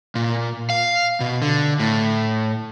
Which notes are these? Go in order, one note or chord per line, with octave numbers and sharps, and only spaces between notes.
A#2
F5
B2
D3
A2